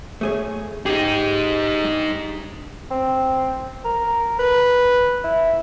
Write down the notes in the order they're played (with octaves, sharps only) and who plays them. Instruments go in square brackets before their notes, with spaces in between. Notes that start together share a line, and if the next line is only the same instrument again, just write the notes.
[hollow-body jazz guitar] A3 G#4 C#5
[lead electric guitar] D#4 G#4 [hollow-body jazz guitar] G4
[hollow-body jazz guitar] G2
[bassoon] C4
A#4
B4
E4